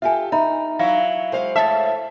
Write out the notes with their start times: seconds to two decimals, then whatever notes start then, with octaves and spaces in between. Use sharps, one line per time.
0.02 F4 G4 A4 E5 G#5
0.32 D#4 E5 A#5 B5
0.79 F#3 E4 F5
1.32 G#3 C5 F5
1.56 A2 E5 A5 A6